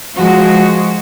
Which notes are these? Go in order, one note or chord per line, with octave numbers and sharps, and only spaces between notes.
F3 G#3 F#4